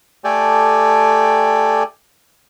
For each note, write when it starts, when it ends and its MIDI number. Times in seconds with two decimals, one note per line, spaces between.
0.24 1.83 57
0.24 1.83 67
0.24 1.83 69
0.24 1.83 74
0.24 1.83 79
0.24 1.83 80